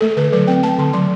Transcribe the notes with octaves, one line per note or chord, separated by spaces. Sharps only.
A3 A4
D3 B4
F#3 B4
C4 G5
A3 A5
D3 C6
F#3 C6